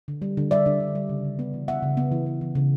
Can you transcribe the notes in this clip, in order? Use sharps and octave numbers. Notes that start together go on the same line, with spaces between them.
D3
G3
D3
G3 D5 E5
D3
D3
G3
C#3
C#3
B3
E3
B3 E5 F#5
C#3
B3
E3
B3
E3
C#3